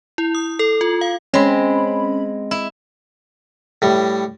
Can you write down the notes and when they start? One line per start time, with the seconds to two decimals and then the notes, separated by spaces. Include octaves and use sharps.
0.18 E4
0.35 D#6
0.59 A4
0.81 F4
1.01 F5
1.34 G#3 C4 C#4 B5
2.51 E4
3.82 A2 G3